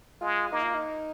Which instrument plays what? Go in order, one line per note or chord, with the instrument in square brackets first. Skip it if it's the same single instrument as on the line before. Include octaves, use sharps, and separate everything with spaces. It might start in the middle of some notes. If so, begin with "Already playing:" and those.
[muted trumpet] G#3 [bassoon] F4
[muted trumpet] A#3 [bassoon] D#4
[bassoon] F4
D#4